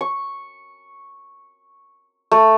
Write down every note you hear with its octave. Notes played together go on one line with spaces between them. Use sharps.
C#6
A3